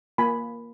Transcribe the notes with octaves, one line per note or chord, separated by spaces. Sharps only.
A#3 F4 G#5 B5